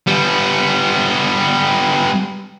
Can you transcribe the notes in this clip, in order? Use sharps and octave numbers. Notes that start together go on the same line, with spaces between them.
G3 B3